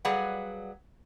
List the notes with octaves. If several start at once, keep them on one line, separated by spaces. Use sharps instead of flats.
F#3 G3 G#4 B4 F5 F#5